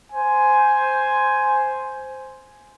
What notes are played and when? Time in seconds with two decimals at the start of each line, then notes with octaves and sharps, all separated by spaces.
0.13 C5 G#5